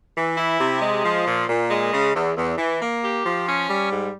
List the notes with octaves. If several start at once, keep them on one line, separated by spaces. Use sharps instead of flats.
E3
E4
C3
G#3
F3
A#2
A#2
G#3
C#3
E2
E2
E3
A#3
G4
F3
C#4
G3
G#2